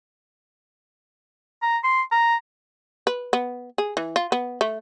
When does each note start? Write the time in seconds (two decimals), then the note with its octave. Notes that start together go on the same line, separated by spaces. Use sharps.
1.62 A#5
1.84 C6
2.12 A#5
3.07 B4
3.33 B3
3.78 G#4
3.97 E3
4.16 F4
4.32 B3
4.61 A3